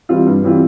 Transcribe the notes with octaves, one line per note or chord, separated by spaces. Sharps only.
E3 G3 C4 F4
G2
E3 G3 C4 F4